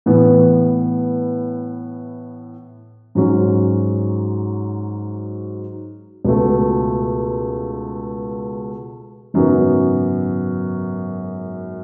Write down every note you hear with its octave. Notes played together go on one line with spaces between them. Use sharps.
A2 E3 B3
G#2 F#3 C#4
C#2 B2 A3
G#1 F#2 C#3 F#3 B3